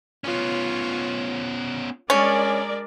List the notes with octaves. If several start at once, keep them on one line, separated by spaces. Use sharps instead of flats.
B3 C#4 F4 C#5
G#3 C#4 D4 A#4 D5